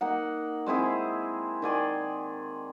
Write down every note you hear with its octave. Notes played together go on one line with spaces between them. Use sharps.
A#3 D#4 F#5
G#3 C4 E4 G#4
D#3 D5 G#5 C6